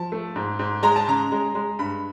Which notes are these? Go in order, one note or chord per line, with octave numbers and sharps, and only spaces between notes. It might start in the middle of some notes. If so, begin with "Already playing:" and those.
Already playing: F3 A5
A3
G#2
G#2
G#3 A#5
A5
C#3 A#5
G#3
G#3
G2 B5